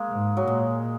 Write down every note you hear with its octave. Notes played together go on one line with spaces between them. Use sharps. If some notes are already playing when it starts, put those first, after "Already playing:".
Already playing: G#3 A#3
G#2
F#3
A#2 G#3